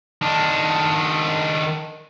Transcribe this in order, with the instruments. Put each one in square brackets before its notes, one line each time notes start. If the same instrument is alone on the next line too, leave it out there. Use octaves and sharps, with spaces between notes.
[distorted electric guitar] D#3 D4